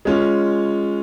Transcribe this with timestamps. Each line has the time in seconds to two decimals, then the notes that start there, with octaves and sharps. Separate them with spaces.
0.05 G#3 C#4 F4